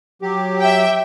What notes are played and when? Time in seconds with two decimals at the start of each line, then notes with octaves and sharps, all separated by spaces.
0.22 F#3 G4
0.60 E5 G5